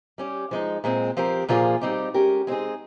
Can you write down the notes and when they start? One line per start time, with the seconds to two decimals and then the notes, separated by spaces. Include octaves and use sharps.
0.18 G3 C#4 G4
0.51 F3 G#3 D#4
0.84 A#2 G#3 C4
1.17 F3 C4 G4 A#4
1.48 A#2 F3 A#3 F4 G#4
1.81 G3 C4 D#4 G4
2.14 G#3 C#4 G4 A#4
2.47 G#3 C4 D#4 G#4